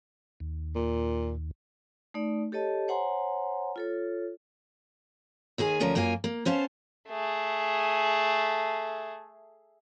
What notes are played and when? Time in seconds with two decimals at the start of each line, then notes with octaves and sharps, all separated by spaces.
0.40 D#2
0.75 A#2
2.14 A3 D#4 D5
2.52 G4 A4 C#5 D#5 A5
2.88 C5 C#5 F#5 G#5 A#5 C6
3.76 F4 A4 C#5
5.58 D#2 D#3 G#4 G#5
5.80 D2 F3 C#4 A#4
5.95 F#2 A#3 F4 F5 G#5
6.24 A#3
6.45 B3 C#4 C5 F5 A5
7.09 A3 G#4